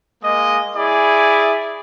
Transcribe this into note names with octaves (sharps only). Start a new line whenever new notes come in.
G#3 A#3 D#5
E4 G#4 D5